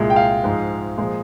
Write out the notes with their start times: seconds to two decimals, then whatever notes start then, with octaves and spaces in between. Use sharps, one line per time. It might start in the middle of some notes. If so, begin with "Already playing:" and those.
Already playing: C2 A#2 G#3
0.10 G5
0.16 F5
0.44 G#2 F3 G#3
0.98 A#2 F3 G#3